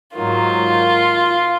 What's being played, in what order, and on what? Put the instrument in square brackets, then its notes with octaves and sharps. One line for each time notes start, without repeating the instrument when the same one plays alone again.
[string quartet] G#2 D#3 F#3 F4